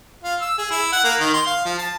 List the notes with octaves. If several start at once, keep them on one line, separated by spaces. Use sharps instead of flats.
F4
E6
G#4
E4
F#5
A#3
D#3
C6
F5
F3
A5